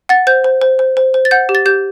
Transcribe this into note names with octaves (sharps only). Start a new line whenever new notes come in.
F#5 A6
C5 G6
C5
C5
C5
C5
C5
A6
F#5 G6
G4
A6
G4 G6